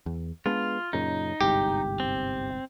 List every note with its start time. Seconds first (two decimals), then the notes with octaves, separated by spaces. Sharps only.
0.06 E2
0.46 G#3 B3 D4 F4
0.93 F#2 A#2 C#3 D#4
1.41 G1 C2 G#2 G4
2.00 C4